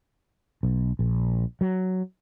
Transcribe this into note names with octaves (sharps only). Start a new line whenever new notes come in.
B1
A#1
F#3